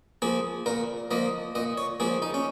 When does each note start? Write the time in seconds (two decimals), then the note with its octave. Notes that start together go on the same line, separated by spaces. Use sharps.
0.22 F3 A#3 G#4
0.66 A#2 A#4
1.11 F3 A#3 D#5
1.55 A#2 D#5
1.78 C#5
2.00 F3 A#3 G#4
2.22 D#4
2.34 C#4